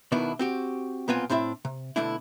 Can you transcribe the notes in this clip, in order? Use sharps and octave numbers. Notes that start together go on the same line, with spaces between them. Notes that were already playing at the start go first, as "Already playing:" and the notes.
B2 D#3 B3 D4 E4
C4 F#4 G4
B1 A#2 B3 C4 F4 G#5
A2 C4 D4 E4 E5
C3
B2 D3 A3 D4 E4